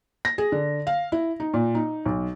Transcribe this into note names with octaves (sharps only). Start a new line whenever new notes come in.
A#6
G#4
D3
F5
E4
D#4
A#2
D#4
B1